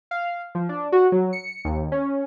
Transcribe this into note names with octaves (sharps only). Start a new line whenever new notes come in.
F5
F3
D4
F#4
F#3
C#7
D#2
C#4